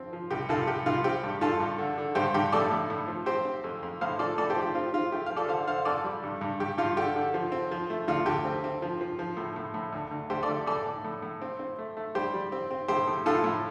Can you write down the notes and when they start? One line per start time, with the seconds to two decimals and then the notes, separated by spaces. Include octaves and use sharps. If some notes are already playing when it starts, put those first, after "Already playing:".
Already playing: F3 C4
0.13 F3
0.31 C2 G4
0.49 C2 F4 A4
0.67 C2 G4
0.86 C2 F4
1.04 C4 G4
1.24 G2
1.41 G2 F4 A4
1.60 G2
1.78 D3
1.98 D3
2.15 G2 G4 C5
2.34 G2 G4
2.52 A2 A4 D5
2.71 A2
2.90 A2
3.08 F3
3.26 C4 G4 C5
3.45 C4
3.64 F2
3.83 F2
4.01 A2 C5 F5
4.19 F3 A4 D5
4.38 A2 A4 D5
4.50 G4 C5
4.56 F3
4.62 G4
4.75 C4 F4
4.93 C4 F4
5.12 A3 G4
5.26 F3 F5
5.36 A4 D5
5.49 D3 C5 F5
5.68 D3 C5 F5
5.85 F2 A4 D5
6.04 G3
6.23 G2
6.41 G2
6.60 G2 G4
6.78 G2 F4
6.96 D3 G4
7.16 D3
7.34 F3
7.52 C4
7.71 F3
7.90 A3
8.08 D2 F4
8.26 D2 G4
8.45 C4
8.64 C4
8.82 F3
9.01 F3
9.19 F3
9.37 A2
9.56 A2
9.74 A2
9.92 D2
10.11 D2
10.30 D2 G4 C5
10.42 A4 D5
10.49 D2
10.67 A2 A4 D5
10.86 A2
11.05 A2
11.22 A2
11.42 C4
11.59 C4
11.78 A3
11.97 A3
12.15 G3 G4 C5
12.34 G3
12.52 C4
12.71 C4
12.88 A2 G4 C5
13.08 A2
13.26 A2 F4 A4
13.44 A2